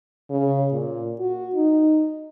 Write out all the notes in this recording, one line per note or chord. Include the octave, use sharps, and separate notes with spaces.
C#3
A#2
F#4
D#4